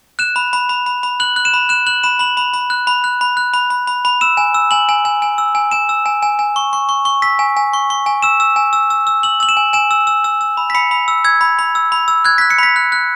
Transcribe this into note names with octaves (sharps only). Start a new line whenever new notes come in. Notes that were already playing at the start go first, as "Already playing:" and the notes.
F#6 E7
B5
B5
B5
B5
B5
F#6 F#7
F#6
E7
B5
F#6 E7
F#6 F#7
B5 E7
B5 F#7
B5
B5
F#6
B5
F#6
B5
F#6
B5
B5
B5
B5
E6 E7
G#5
E6
G#5 F#7
G#5
G#5
G#5
E6
G#5
G#5 E7
E6
G#5
G#5
G#5
C#6
C#6
C#6
C#6
E6 B6
G#5
G#5
C#6
C#6
G#5
E6 E7
E6
G#5
E6
E6
E6
E6 F#7
E6 F#7
E7
G#5
G#5 E7
E6
E6
E6
E6
B5
B6
B5 C#7
B5
E6
E6 G#6
B5
B5
E6
B5
E6
F#6 G#6
F#6 B6
C#7
B5 B6
F#6
F#6